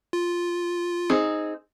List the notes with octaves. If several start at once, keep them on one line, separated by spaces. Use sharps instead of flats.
F4
C4 D#4 G#4